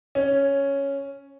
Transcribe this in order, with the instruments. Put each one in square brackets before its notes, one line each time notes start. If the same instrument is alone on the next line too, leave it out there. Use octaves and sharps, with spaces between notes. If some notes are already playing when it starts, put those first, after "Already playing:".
[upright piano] C#4